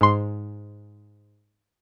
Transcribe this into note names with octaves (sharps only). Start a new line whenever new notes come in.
G#2 C6